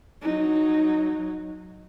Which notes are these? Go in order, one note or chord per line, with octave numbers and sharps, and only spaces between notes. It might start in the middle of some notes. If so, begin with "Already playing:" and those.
F#3 D#4